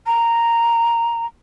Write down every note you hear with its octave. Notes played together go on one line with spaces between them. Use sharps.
A#5